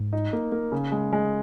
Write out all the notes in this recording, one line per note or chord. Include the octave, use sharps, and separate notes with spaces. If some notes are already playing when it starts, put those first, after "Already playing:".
Already playing: G#2
D#4
A#3
A#3
C#3
G#3
G#3